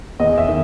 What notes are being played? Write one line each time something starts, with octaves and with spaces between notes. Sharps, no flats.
E2 D#5
E5
D#3